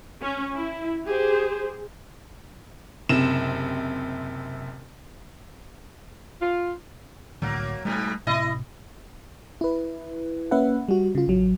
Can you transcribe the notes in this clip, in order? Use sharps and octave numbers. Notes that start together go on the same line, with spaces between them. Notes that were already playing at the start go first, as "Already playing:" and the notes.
C#4
E4
G4 G#4 C5
F#1 C3 E7
F4
C2 A2 D3 F#3 A#3
G#2 B2 G3 A3
A2 C3 E4 D#5
E4 B4
A#3 C#4 B4 E5 F#5
G3 F#4
C#3 F4
A1 F#3